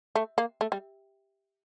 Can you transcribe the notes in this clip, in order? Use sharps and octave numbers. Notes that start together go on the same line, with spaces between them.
A3
A#3
A3
G3